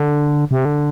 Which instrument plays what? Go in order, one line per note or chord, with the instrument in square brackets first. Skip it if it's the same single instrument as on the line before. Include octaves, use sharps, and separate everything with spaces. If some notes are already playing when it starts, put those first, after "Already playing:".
Already playing: [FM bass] D3
C3
D3